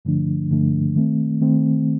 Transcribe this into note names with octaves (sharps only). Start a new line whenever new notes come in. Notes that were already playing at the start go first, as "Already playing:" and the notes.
G2 D3 F3 A3 D4
G2 D3 F3 A3 D4
D#3 A3 C4
D#3 A3 C4